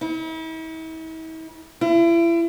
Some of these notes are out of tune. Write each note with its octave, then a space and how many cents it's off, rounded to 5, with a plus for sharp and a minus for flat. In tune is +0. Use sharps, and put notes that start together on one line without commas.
E4 -45
E4 +35